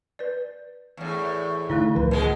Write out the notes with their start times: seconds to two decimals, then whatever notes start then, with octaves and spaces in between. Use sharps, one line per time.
0.19 B4 D5
0.97 E2 A2
1.70 D3 A3 D#4 E4
1.95 C#2 A2 D#3 F3 B4
2.11 B2 G#3